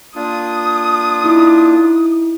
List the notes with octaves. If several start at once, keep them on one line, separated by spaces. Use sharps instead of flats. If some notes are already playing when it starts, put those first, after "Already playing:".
A#3 D4 F4 D#6
D#4 E4